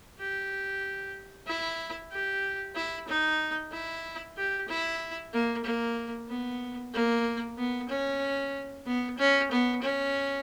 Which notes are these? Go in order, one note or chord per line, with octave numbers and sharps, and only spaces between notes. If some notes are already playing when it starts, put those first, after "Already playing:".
G4
E4
G4
E4
D#4
E4
G4
E4
A#3
A#3
B3
A#3
B3
C#4
B3
C#4
B3
C#4